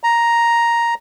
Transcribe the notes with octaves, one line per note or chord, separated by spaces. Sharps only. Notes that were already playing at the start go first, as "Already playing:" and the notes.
A#5